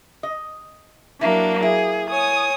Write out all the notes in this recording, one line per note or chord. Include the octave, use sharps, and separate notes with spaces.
D#5
F#3 A#3 D4 E4
A#3 E4 G#4
C#5 G#5 D#6